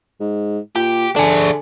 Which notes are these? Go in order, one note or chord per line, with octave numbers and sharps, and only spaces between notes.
G#2
A#2 G4
D3 D4 G#4